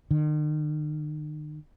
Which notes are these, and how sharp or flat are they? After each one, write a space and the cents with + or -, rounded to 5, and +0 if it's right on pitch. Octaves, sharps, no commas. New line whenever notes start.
D#3 -45